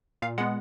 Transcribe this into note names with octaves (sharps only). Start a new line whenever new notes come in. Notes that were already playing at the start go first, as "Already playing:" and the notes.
A#2 F5
G#3 B3 F#5